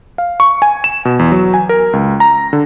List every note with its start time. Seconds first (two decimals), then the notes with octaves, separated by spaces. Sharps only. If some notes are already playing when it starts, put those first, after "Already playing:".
0.18 F5
0.40 C#6
0.62 G#5
0.84 E7
1.05 B2
1.19 E2
1.32 F#3
1.54 G#5
1.69 A#4
1.93 C#2
2.20 A#5
2.53 D3